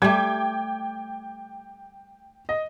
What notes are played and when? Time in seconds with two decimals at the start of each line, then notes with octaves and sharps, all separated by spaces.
0.02 G3 A3 G5 D6 G#6
2.49 D#5